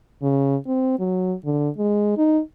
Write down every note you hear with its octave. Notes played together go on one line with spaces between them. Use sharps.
C#3
C4
F#3
D3
G#3
D#4